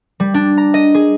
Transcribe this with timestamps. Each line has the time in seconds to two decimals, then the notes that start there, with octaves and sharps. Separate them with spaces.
0.20 G3
0.34 D4
0.57 A#5
0.74 D#5
0.94 G#4